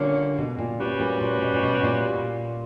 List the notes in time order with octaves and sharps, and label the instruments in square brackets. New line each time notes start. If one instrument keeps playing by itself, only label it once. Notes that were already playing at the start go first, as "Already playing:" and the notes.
Already playing: [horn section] A#2 G3 A#3 C#4 [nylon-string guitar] D3
[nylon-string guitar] B2
A#2
[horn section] G3 C#4 F#4 B4
[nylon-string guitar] A#2
A#2
B2
A#2
B2
A#2